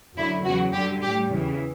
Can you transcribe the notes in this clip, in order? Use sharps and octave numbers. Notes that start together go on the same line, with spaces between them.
F#2 D3 F#3 E4
E2 C#3 F#3 F#4
F#2 D3 G3 G4
A2 G3 G4
E2 C#3 E3